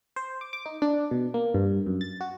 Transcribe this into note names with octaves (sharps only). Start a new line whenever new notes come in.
C5
D6
D6
D#4
D4
B2
A#3
G2
F#2
A6
F#4